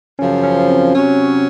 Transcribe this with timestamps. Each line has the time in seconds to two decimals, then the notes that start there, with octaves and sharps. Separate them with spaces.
0.18 F#2 C#3 F3 C#4
0.43 C#4
0.69 C4
0.94 C3 F#3 C#4